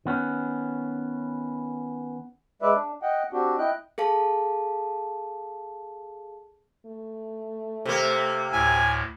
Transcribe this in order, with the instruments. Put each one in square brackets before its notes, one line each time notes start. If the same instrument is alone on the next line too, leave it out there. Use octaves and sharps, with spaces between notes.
[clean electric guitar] D#3 B3 C#4
[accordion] G#3 B4 D5 E5
D4
D#5 F#5 G5
C4 D4 F#4 G4
E4 D#5 G5 F#6
[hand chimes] G#4 A4 F5 A5
[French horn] A3
[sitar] C3 A#3
[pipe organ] D2 A2 [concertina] G#5